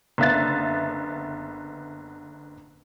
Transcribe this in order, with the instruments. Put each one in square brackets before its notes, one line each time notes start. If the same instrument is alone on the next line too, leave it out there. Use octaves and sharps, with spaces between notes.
[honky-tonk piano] F#1 D3 B3 E5 F5 A6